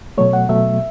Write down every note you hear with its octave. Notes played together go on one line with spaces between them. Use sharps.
B2 F#3 A3 C#5
F#5
B2 F#3 A3 E5